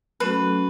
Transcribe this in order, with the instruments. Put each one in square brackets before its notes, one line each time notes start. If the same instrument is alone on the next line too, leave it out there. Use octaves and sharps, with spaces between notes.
[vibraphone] F#3 A3 C#4 F#4 A4 [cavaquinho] B4